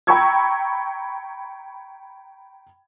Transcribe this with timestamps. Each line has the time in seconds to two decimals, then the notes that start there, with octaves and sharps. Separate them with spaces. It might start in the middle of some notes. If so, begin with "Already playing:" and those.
0.07 G5 A#5 B5 C#6 E6 G#6